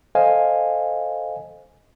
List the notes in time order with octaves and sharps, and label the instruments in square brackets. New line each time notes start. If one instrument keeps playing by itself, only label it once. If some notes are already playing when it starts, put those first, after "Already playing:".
[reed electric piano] A4 C5 D#5 F5 G#5